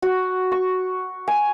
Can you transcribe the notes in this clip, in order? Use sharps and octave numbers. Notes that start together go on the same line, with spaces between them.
F#4
C#6
G#5